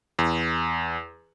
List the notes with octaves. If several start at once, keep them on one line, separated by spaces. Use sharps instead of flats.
E2